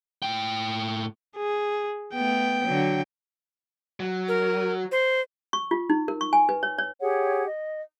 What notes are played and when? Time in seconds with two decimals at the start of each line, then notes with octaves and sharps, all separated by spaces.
0.22 A2 G5
1.36 G#4
2.14 A3 B3 G5
2.65 D3 F#3
4.00 F#3
4.28 A#4
4.92 C5
5.53 C#6
5.71 F4
5.90 D#4
6.08 A#4
6.21 C#6
6.33 G#5
6.49 B4
6.63 C#5
6.79 C#5
7.01 G4 G#4 C#5 F#5
7.46 D#5